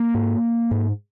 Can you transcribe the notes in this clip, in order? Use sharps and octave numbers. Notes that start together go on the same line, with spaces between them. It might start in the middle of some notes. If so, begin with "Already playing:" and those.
Already playing: A#3
G#2
G#2